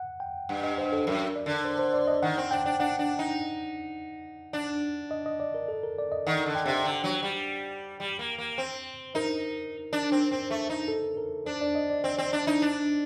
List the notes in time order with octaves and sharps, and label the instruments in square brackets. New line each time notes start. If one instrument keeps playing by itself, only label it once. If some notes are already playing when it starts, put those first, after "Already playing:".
Already playing: [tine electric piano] F#5
G5
[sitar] G2 [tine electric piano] F#5
[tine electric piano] D#5
C5
A4
[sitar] F#2 [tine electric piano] A#4
[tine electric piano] D5
[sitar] D3
[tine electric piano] C5
C5
D5
D#5
[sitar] D#3 [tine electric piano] F#5
[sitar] C4
[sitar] D4 [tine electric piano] G5
[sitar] D4
[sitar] D4 [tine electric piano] F#5
[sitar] D4
D#4
D4
[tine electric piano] D#5
D#5
D5
A#4
A4
A#4
D5
D#5
[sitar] D#3 [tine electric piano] F#5
[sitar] D3
[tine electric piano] G5
[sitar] C3
[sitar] D3 [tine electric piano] G5
[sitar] F#3
G3
G3
A#3
A#3
C4
[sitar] D#4 [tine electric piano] A#4
[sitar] D4
C4
C4
A3
D#4
[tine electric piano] A4
A#4
[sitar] D4 [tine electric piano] C5
[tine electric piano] D5
D#5
D5
[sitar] C4
C4
D4
D#4
D4